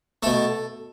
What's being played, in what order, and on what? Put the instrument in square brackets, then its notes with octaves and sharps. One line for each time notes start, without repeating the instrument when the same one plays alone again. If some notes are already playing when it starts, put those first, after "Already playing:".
[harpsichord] B2 A3 A4